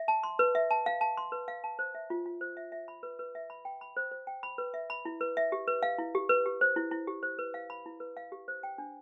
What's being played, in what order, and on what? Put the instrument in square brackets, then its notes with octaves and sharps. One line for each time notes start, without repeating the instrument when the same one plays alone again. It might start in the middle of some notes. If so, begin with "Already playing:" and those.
Already playing: [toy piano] E5
A5
C6
B4
E5
A5
F5
A5
C6
B4
F5
A5
C5
E5
F4
F4
C5
E5
E5
B5
B4
B4
E5
B5
G5
B5
C5
C5
G5
B5
B4
E5
B5
E4
B4
E5
G4
B4
F5
E4
G4
B4
G4
C5
E4
E4
G4
C5
B4
F5
B5
E4
B4
F5
G4
C5
G5
D4